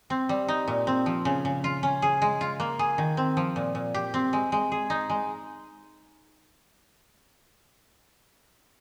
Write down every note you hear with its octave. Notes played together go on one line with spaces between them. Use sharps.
C4
G3
D#4
A#2
C4
F3
C#3
C#3
F4
C#4
G#4
G#3
F4
A#3
G#4
D#3
C4
F3
A#2
A#2
G4
C4
G#3
G#3
G#4
D#4
G#3